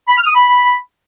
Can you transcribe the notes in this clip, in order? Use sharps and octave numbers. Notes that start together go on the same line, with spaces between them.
B5
F6
D#6
B5